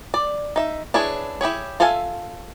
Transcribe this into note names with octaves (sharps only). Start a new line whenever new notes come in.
D5
D#4 E5
D4 E4 G#4 B4 C#5
E4 G4 G#4 C#5
F4 A4 E5 F5 G#5